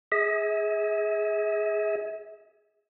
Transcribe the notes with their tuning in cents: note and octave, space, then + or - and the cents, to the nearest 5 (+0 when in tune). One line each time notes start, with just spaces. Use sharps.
G#4 +0 E5 -40